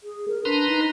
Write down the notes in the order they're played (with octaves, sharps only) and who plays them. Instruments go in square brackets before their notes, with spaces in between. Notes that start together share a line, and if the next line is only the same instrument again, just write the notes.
[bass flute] G#4
A#4
[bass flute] D4 [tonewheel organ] B4 A#5 C6
[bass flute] D#4